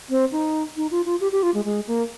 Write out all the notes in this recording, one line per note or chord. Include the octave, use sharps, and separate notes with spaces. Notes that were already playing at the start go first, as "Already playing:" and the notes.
C4
D#4
D#4
F4
F4
G4
G4
F4
G#3
G#3
A#3